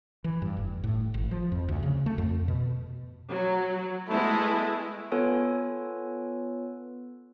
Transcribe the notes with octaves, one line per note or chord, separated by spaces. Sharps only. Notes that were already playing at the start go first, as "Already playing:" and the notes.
E3
G2
F1
A2
G#1
F3
F2
D2
C#3
A3
F2
B2
F#3
G#3 A3 B3 E4
B3 F4 A4 B4 C#5 G#5